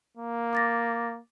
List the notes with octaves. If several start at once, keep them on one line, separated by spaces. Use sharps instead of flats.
A#3
D6 A6 A#6